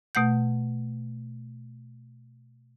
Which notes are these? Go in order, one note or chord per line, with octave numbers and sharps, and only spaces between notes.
B2 A3 F#5 G6